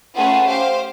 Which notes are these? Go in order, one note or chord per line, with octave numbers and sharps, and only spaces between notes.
A3 C#4 F4 G#4 B4 F#5
G4 C5 F5